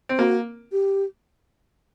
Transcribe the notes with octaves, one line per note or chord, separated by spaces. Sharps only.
C4
A#3 F#4
G4